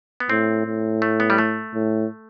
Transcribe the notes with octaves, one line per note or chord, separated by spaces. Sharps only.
B3
A2 C4
A2
A3
B3
G3
A3
A2